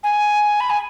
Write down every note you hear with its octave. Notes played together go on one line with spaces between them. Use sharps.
G#5
B5
G#5